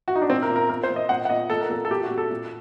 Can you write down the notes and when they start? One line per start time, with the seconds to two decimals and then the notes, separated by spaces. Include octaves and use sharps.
0.08 F#4
0.16 D#4
0.22 D4
0.30 A#2 C4
0.42 A#4
0.50 A#2
0.56 A#4
0.69 A#2 A#4
0.83 C5
0.89 A#2
0.96 D#5
1.09 A#2 F#5
1.25 F#5
1.30 A#2 D#5
1.50 A#2 A4
1.61 A#4
1.70 A#2 A4
1.85 A4
1.90 A#2 G4
2.03 F#4
2.10 A#2
2.18 A4
2.31 A#2